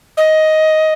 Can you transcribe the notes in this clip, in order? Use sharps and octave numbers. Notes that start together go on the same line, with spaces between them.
D#5